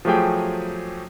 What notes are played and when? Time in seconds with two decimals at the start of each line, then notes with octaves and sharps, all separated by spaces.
0.05 F3 F#3 A3 G4 G#4 G5